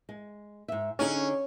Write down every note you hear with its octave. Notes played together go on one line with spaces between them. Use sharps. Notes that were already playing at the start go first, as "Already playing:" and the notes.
G#3
G#2 E5
D3 C#4 D#4 G#4